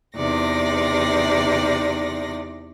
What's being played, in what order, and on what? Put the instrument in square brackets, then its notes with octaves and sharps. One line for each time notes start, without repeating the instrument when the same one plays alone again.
[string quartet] E2 C3 D#4 D5 A#6